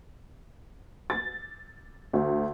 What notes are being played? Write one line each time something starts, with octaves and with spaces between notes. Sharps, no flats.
A6
D2